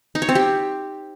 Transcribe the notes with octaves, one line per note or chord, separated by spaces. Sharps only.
D#4
C#5
C4
G4